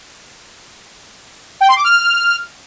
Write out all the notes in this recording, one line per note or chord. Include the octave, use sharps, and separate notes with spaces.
G5
C6
D6
F6